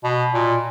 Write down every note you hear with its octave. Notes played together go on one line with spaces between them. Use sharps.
B2
A#2